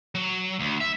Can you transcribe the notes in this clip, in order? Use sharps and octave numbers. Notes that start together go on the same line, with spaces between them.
F#3
D2
E5